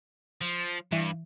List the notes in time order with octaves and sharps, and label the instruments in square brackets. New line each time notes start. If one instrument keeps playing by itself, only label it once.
[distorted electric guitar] F3
[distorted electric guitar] G2 [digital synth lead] E3